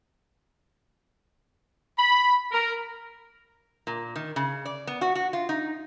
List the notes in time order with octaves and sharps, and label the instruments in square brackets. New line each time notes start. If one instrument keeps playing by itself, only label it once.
[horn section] B5
A#4
[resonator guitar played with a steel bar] A#2
D#3
C#3
D5
B3
F#4
F#4
F4
D#4